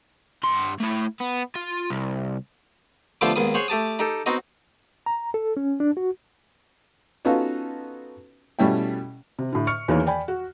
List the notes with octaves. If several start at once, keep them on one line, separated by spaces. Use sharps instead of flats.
G2 C6
A3 E4
B3
F4
C2
D3 F3 A3 B3 F4 G4
D#2 G#2 B3 D#6
G#4 C5 C#5 F#5
A3 G4 A5 D#6
D#4 G4 A4
B3 C4 D#4 F#4 D#5
A#5
A4
C#4
D4
F#4
B3 C#4 D#4 F4 F#4 A4
B2 G3 A3 C#4 E4 G5
C3
A2 D3
C#6 F6 C#7
E2 D#3 E3 A#3 A#4 C#5
D5 G5 G#5 B5
F#4